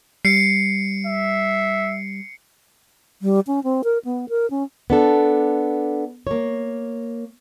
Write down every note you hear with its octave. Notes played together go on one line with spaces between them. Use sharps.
G3 C7 C#7
E5
G3
C#4
C4
A#4
B3
A#4
C#4
B3 D4 A4
A#3 C#5